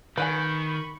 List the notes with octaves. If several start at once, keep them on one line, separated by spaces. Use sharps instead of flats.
D#3 B4 F#5 G#5 B5 C#6